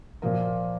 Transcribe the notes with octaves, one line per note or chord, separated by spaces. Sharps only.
A#2 F3 A#4